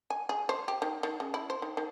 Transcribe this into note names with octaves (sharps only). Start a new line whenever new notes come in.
G#5
G#4
C5
G4
D#3
D#3
C#3
E4
C5
D#3
D#3